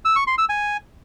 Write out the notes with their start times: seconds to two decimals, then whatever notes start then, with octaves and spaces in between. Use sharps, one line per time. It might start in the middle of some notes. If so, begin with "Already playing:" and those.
0.05 E6
0.16 C#6
0.27 C6
0.38 E6
0.49 G#5